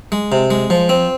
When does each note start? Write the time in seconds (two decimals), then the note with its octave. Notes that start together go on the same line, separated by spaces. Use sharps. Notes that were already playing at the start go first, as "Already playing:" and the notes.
0.12 G#3
0.32 C3
0.50 G#3
0.70 F3
0.89 C4